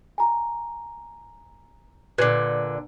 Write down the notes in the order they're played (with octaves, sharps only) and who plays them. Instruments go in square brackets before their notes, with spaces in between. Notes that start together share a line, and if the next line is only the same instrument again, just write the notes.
[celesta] G#5 A#5
[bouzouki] A#2 D3 [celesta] B4 F#6 G#6